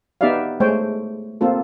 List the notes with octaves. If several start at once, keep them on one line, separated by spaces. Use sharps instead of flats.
B3 D#4 G4 D5 E5 F5
G#3 A3 C5 C#5 G5
A#3 C4 F4 A4